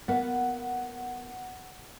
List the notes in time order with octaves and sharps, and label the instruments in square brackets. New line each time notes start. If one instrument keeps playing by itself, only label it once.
[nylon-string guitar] A#3 B3 [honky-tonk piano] F#5